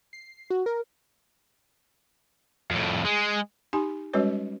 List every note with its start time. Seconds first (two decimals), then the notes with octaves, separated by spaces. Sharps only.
0.13 C7
0.50 F#4
0.66 A#4
2.71 F2 A2
3.05 G#3
3.73 D#4 G4 G#5 C6
4.14 G3 G#3 C#4 F#4 B4 C#5